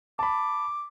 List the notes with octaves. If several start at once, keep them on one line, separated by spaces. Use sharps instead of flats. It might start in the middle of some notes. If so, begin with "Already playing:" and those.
A5 B5 D6